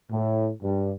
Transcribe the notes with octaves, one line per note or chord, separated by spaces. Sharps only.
A2
G2